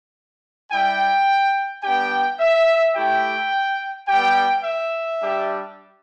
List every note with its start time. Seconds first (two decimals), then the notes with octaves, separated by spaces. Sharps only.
0.71 G3 E4 G4 G5
1.83 G3 B3 D4 G4 G5
2.40 E5
2.95 A3 E4 G4 G5
4.08 G3 B3 G4 G5
4.64 E5
5.20 G3 D4 G4